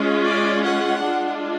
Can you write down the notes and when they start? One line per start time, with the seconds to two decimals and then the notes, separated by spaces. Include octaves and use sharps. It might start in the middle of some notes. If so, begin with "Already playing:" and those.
Already playing: G#3 C#4 F4
0.26 D5
0.65 F#5
1.02 G#3 D4 F4